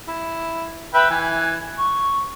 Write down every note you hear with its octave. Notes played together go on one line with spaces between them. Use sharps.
E4
B4 E5 G5
E3 G#5
C#6